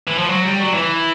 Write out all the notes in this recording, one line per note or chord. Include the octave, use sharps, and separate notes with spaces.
E3
F3
F#3
G3
F#3
E3